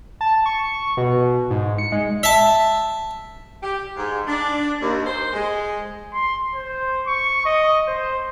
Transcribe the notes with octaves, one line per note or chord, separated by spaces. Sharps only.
A5
C#6
B2
G#2
C#7
G#3
E5 A5
G4
G#2
D4
D#2
C5
G#3
C6
C5
C#6
D#5
C5